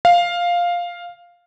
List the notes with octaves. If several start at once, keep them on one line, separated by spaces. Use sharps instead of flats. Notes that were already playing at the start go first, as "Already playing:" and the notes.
F5